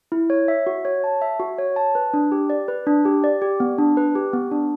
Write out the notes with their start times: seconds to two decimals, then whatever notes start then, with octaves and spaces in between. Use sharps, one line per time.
0.12 E4
0.30 C#5
0.48 E5
0.67 F#4
0.85 C#5
1.04 A5
1.21 E5
1.40 F#4
1.58 C#5
1.76 A5
1.95 B4
2.14 D4
2.32 G4
2.50 D5
2.68 B4
2.87 D4
3.05 G4
3.24 D5
3.42 G4
3.60 B3
3.78 D4
3.97 B4
4.15 G4
4.33 B3
4.51 D4